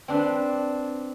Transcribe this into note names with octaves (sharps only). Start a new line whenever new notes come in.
C4 D4 B4